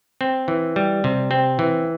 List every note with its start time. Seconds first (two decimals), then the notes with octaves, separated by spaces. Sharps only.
0.21 C4
0.48 E3
0.76 G3
1.04 C3
1.31 C4
1.59 E3